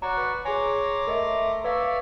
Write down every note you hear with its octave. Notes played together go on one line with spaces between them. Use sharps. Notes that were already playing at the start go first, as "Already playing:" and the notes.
F#4 C#5 D5 A#5 C#6
B4
G#4 C#5 G#5 A#5 C6 D6
A3 A#4 D#5 E5
B4 C#5 D5 E5 F5